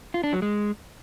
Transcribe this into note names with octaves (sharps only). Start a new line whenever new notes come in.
F4
D4
F#3
G#3